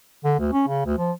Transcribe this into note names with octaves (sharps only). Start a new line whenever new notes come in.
D3
D2
C#4
C#3
D2
F3